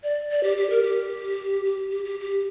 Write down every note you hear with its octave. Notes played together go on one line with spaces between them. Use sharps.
D5
D5
G4
G4
A#4
G4
G4
G4
G4
G4